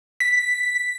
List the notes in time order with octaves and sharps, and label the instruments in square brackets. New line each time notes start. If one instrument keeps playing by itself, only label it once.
[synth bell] B6